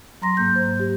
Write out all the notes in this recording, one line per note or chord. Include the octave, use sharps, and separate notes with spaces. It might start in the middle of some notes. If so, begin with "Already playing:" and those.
F#3 A#5 C6 A#6
G#2 A#3 G6
C5
G4